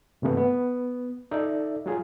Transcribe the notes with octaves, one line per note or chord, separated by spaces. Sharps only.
G2 C3 E3 A3 B3
B3
D#4 A4 D5 E5
F#3 F4 G#4